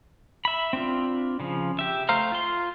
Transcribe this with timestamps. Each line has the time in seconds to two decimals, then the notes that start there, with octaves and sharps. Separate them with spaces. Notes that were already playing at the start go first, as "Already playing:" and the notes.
0.45 E5 B5
0.73 C4 D4 F4
1.40 C#3 F3
1.79 G4 E5
2.09 A3 C5 F5 A#5 F6
2.32 F4 C6